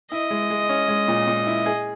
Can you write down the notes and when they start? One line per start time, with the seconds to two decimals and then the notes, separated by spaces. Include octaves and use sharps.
0.12 E4 D#5
0.31 G#3
0.50 G#3
0.69 C#4
0.88 G#3
1.08 A#2
1.28 A#2
1.47 E4
1.66 G#4